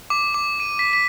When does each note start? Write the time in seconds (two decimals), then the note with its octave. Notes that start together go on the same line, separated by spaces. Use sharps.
0.10 D6
0.34 D6
0.60 D#7
0.79 B6
0.93 B6